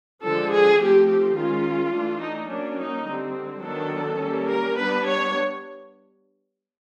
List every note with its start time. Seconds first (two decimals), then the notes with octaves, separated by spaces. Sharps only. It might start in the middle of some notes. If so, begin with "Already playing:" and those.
0.23 D3 F3 G#3 A4
0.51 G#4
0.80 F3 A3 C4 G4
1.08 G4
1.37 D#3 G#3 C#4 F4
1.93 E3 A3 D4
2.22 D#4
2.50 F#3 A#3 C#4 D4
2.79 D#4
3.08 D3 G3 C4
3.64 D#3 F#3 B3 D4 A4
4.21 G3 A#3 C#4
4.49 A#4
4.78 G3 B3 D4 B4
5.06 C#5